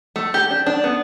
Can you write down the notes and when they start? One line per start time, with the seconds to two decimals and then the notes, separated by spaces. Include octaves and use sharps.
0.16 A3
0.34 G4
0.50 D4
0.67 D4
0.84 B3